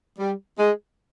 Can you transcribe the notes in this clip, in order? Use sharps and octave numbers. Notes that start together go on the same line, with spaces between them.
G3
G#3